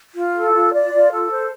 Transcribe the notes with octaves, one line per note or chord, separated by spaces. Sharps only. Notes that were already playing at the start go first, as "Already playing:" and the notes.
F4
A4
F4
D5
F4
A4
C5